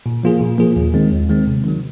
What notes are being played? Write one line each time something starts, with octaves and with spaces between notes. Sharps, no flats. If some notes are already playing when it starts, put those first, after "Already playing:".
A#2
F3 A#3 F4 G#4
A#2
F3 A#3 F4 G#4
D#2
D#3 G#3 C4
D#2
D#3 G#3 C4
C3
D#3 F#3